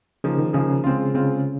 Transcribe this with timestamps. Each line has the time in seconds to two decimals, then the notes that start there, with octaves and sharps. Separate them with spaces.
0.24 C#3 F3 A#3 D#4 G#4
0.39 D#3
0.53 C#3 F3 A#3 D#4 G#4
0.84 G#3 C4 F4
1.14 C#3 G#3 C4 F4